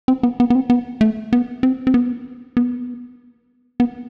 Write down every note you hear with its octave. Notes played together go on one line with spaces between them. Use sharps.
C4
B3
B3
B3
C4
B3
A3
B3
C4
C4
B3
B3
B3